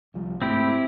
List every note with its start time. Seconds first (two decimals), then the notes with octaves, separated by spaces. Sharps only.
0.14 C2 F3 G3
0.42 G#2 A3 C4 E4 G4